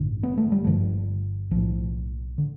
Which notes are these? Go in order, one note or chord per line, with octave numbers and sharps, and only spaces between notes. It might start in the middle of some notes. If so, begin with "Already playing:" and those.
Already playing: A1 G2 D3
B3
A3
G3
G1 G2 D3 F3
B1 A2 F3
D3